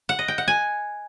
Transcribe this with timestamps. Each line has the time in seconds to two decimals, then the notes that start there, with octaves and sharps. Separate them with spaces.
0.09 F#5
0.19 D#5
0.28 G5
0.38 F#5
0.48 G#5